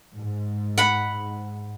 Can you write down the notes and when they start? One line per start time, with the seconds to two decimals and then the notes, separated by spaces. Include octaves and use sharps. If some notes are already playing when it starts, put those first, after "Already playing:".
0.15 G#2
0.78 F#5 B5